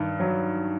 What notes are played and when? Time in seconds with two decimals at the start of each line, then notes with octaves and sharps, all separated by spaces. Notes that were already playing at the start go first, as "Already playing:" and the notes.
Already playing: G2 D#3
0.20 F#3